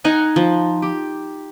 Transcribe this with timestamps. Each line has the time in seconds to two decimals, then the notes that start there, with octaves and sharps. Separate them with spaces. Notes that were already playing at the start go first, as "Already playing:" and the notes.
0.04 D#4 F#5 G#5 A#5
0.36 F3
0.82 G4